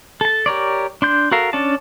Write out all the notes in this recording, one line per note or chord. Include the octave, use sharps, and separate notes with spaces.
A4 A5
G4 A#4 C#5 D5
D4 C6 G6
F#4 A4 A#4 F5
C#4 D4 D5 A5